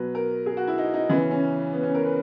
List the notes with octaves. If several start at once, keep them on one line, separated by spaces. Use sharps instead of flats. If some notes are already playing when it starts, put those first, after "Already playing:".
Already playing: B2 F#3 B4
A#4
G#4
F#4
E4
D#4
D#4
C#3 E3 B3
C#4
C#4
B3
C#4
A#4
B4